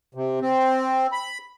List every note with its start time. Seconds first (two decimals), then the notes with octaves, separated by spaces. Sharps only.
0.15 C3
0.41 C4
1.12 B5